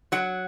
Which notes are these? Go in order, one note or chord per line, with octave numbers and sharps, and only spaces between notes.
F#3 F#5